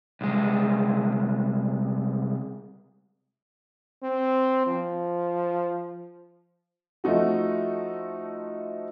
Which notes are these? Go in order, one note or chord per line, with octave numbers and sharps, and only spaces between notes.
C2 G#3
C4
F3
F3 A3 D#4 F#4